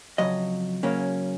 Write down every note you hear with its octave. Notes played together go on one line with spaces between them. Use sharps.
F2 C#3 F#3 D#5
F#2 C#3 F#3 A#3 C#4